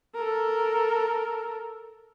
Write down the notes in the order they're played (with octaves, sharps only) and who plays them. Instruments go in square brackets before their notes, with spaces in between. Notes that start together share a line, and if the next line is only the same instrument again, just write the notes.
[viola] A4 A#4